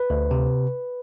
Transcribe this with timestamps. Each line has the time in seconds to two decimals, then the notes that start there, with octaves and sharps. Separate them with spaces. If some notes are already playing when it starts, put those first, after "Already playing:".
Already playing: B4
0.10 D2
0.31 C3